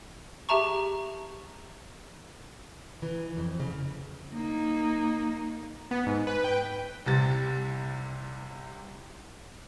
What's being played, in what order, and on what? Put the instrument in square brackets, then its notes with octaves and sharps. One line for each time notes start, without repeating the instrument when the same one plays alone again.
[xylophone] G4 G#4 E5 A5 A#5 C#6
[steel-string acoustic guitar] E3
F2
C#3
[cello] A#3 D#4
[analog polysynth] B3
G#2
B4
G5
[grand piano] C2 C3 A6